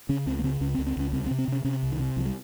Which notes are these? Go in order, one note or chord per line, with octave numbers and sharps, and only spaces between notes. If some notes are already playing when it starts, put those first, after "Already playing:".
C#3 C#4
C#2 C4
A#3
C#3 C4
C#2 C#4
C4
C#2
C4
C#2 C#4
C2 C4
C4
C3
C4
C3 C#4
C3 C#4
C2
D#3
C3
C2 F3
G3